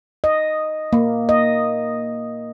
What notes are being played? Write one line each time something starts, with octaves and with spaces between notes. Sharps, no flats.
D#5
A#3
D#5